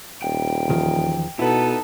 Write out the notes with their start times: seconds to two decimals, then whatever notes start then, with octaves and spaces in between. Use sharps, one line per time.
0.22 D#1 G5
0.69 E2 D#3 F3
1.39 B2 B3 D#4 E4 A4 B4